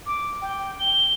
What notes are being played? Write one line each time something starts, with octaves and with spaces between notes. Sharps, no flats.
D6
G5
G7